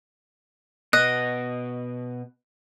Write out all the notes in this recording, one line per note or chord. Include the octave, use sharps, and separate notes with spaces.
B2 B3 D#5 F#6